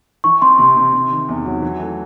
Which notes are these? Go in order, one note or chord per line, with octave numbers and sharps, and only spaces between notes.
E3 C#6
C4 C6
C3 C6
C3
C3
D#3
E2
F#3
E3
A3